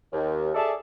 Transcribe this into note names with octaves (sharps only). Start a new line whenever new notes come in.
D#2
G#4 A4 D5 E5 A5